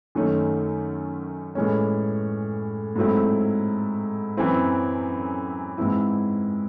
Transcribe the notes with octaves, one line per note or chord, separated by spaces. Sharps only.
F#2 D#3 A3 C#4
A2 E3 G#3 C#4
G#2 F#3 A3 C4 E4
F#2 E3 C4 E4
G#2 E3 C4 E4